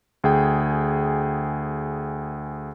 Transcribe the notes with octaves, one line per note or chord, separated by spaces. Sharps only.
D2 G#4 G5